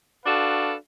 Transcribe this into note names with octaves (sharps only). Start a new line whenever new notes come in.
D4 F#4 A4 B4 F5